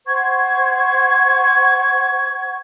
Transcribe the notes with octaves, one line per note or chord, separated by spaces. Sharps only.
C5 F#5 C#6 G#6